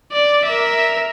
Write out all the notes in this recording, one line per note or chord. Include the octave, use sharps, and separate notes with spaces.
D5
A#4 E5